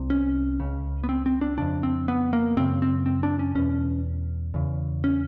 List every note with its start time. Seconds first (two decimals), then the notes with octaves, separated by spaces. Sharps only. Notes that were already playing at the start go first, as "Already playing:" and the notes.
Already playing: C2 C3
0.10 C#4
0.60 C#2 C#3
1.04 B3
1.09 C4
1.26 C4
1.41 D4
1.58 F2 C#3 D4
1.83 C4
2.08 B3
2.33 A#3
2.57 F#2 C#3 C4
2.82 C4
3.06 C4
3.23 D4
3.39 C#4
3.55 E2 B2 C#4
4.54 E2 C#3
5.04 C#4